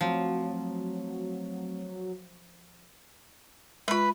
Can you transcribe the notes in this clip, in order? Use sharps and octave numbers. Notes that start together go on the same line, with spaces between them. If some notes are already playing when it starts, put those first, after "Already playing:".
F3 F#3 A3 C4
G#3 F4 B4 B5